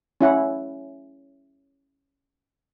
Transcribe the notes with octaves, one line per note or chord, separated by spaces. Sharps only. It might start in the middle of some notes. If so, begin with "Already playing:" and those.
C#4 E4 F#5